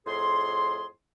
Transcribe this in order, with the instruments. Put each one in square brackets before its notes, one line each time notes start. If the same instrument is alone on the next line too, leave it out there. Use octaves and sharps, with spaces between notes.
[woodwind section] F2 A2 G#4 C6